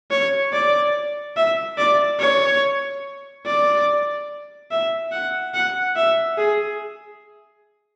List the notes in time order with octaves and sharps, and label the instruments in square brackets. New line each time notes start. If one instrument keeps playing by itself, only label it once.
[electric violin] C#5
D5
E5
D5
C#5
D5
E5
F#5
F#5
E5
G#4